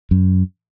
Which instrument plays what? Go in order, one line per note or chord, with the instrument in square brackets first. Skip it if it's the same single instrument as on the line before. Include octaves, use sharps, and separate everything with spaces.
[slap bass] F#2